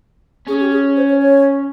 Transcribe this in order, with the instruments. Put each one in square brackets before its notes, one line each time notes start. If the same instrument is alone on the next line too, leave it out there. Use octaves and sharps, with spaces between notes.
[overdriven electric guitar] C#4 [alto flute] G#4
[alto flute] G4
G#4
C5
C#5
C#5